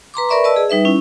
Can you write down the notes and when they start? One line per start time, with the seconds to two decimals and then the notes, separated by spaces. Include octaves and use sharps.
0.14 B4 A#5 C6 D6
0.29 A#4 B4 D5 E5 B5 C#6
0.44 B4 D5 D#5 A5 E6
0.56 G#4
0.69 G3 D#4 B4 E5
0.85 C#4 E4